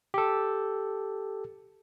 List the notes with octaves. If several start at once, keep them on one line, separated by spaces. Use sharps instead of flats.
G4 A4